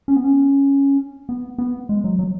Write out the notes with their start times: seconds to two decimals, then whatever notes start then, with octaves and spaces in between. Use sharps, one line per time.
0.08 C#4
0.16 B3
0.24 C#4
1.29 B3
1.58 B3
1.89 G#3
2.04 F#3
2.19 F#3